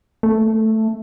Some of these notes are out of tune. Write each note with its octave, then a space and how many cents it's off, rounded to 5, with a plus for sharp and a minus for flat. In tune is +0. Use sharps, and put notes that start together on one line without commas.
A3 +5